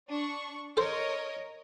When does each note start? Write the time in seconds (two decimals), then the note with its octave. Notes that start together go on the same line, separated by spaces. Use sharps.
0.10 D4 C#6
0.77 A4 A#4 C5 C#5 D#5